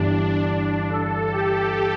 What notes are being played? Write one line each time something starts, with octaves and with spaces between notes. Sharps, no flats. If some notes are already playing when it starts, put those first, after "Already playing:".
Already playing: G1 G2 E3 D4
A4
G4